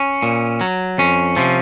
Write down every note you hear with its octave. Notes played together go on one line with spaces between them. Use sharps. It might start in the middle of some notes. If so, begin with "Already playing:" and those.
Already playing: C#4
A#2
F#3
F2 C#4
C3 F3